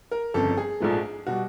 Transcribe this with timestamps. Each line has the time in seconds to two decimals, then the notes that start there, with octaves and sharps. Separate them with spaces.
0.11 A#4
0.34 G1 F2 C#3 A4
0.57 G#4
0.80 A#1 G#2 F3 A3
1.27 B2 G3 F#4